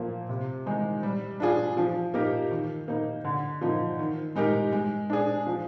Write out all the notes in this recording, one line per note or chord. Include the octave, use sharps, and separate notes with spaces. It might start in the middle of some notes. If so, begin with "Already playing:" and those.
Already playing: A#2 F3 A#3
C3
D#3 G#3 D#4
G3
D4 F4 G#4
F3
A#3 D#4 G4 A#4
D#3
A#3 D#4
D3
F3 A#3 D#4
D#3
G#3 D#4 G4 A#4
G#3
D4 G#4
F3